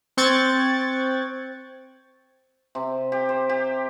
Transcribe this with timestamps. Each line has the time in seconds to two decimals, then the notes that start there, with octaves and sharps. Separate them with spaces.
0.17 C4 G5 C#6 F#6 G#6 A6
2.75 C3
3.12 G4
3.29 C5
3.49 G4